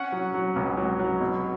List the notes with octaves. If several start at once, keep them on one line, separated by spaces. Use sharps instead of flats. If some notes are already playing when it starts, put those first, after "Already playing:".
Already playing: C#4 F#5
F#3
F#3
C#2
F#3
F#3
B2